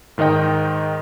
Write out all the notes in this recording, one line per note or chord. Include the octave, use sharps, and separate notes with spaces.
G#2 D#3 D#4 D#5 G5